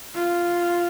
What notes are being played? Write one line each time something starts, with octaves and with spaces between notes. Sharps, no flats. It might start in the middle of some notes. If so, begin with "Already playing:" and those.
F4